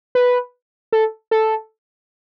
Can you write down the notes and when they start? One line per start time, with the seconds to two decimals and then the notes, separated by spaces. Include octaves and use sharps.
0.15 B4
0.92 A4
1.31 A4